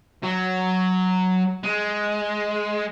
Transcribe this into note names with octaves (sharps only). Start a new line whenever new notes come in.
F#3
G#3